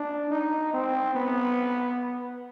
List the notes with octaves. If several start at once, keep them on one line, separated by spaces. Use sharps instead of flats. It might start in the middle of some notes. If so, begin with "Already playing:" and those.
Already playing: D4
D#4
C4
B3